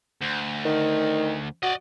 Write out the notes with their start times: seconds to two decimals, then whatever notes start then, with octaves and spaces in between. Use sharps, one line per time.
0.22 D2
0.65 D#3
1.63 F#4 D5 D#5